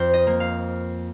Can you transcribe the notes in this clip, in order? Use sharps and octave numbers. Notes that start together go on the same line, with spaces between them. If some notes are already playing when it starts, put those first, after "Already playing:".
Already playing: F2 C5
D#5
A#3
F5